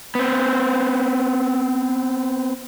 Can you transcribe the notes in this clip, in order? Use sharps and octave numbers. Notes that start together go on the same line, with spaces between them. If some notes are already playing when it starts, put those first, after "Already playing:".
B3 C4